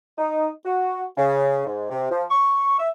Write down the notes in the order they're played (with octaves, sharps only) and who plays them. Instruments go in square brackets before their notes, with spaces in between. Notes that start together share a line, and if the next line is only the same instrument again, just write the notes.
[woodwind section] D#4
F#4
C#3
G#2
C3
F3
C#6
E5